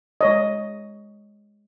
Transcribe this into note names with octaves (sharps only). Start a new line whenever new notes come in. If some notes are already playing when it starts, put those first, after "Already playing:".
G#3 C#5 D#5